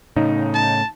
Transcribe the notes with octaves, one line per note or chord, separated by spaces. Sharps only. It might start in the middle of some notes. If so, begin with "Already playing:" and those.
A2 C#3 D#4
A5